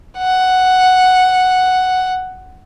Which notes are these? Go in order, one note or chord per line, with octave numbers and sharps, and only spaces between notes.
F#5